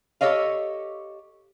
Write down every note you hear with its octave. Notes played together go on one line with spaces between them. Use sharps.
G4 A4 C#5 D#5 F5